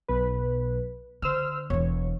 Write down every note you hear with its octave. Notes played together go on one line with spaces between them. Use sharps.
B1 B4
D3 C5 E6 F6
E1 E3 C#5